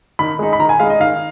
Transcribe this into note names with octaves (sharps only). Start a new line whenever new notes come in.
D#3 B5
G#3 D#4
B5
D#3 A#5
G#5
G#3 D#4 F5
D#5
D#3 F5